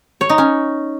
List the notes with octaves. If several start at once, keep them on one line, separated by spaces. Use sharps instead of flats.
C#5
D#4
C#4